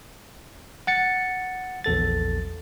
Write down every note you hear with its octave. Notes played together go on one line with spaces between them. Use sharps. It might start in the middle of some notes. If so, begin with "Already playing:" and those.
F#5 A6 C#7
A#1 E2 A4 A6